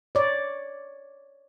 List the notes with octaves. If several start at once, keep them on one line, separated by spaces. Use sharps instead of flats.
C#5 D5